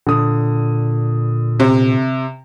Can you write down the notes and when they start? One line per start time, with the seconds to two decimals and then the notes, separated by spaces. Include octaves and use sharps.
0.07 A#2 D3 D#6
1.60 C3